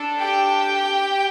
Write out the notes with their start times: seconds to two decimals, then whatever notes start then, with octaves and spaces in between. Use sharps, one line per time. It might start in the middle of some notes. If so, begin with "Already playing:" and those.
Already playing: D4 A4
0.19 G4 G5